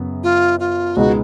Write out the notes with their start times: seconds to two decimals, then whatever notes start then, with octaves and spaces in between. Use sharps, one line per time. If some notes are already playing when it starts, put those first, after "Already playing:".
Already playing: F#2 C#3 B3
0.23 F4
0.60 F4
0.96 C#2 B2 G#3 B3 D#4 F#4